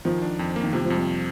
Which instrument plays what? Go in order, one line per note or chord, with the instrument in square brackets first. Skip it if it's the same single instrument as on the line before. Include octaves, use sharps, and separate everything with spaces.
[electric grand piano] D#3 [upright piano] F3
[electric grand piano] D4
F2
A#3
[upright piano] D#3
[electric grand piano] C3 [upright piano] F3
[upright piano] F3
[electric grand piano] F2 [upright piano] G3